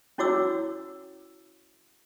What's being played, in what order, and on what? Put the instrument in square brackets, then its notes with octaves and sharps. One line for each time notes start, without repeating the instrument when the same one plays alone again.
[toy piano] C#4 E4 F#4 C#5 D6 E6